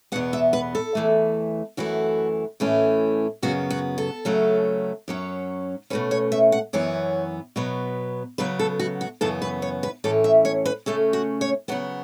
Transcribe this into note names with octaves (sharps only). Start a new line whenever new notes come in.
E2 B2 B3 F#5
E5
B4
A4
E2 E3 A3
F#2 E3 A3 F#4
A2 E3 A3 C#4
F#2 C#3 F#3 B3 F#4
F#4
A4
C#3 F#3 A3 C#4
F#2 F#3 C#4
B2 A3 C#4 B4
C#5
E5
F#5
F#2 E3 B3 C#5
B2 F#3 B3
C#3 F#3 B3 B4
A4
F#4
F#4
F#2 C#3 E3 B3 A4
B4
C#5
B4
A2 E3 C#4 A4
E5
C#5
B4
C#3 A3 C#4 A4
F#4
C#5
C#3 F#3 B3 F#5